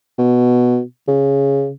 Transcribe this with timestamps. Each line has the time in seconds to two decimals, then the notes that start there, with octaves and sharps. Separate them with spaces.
0.19 B2
1.08 C#3